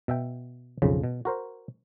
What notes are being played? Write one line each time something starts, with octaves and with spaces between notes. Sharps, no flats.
B2 E5 G5
B1 F2 C#3
B2
F#4 A#4 C5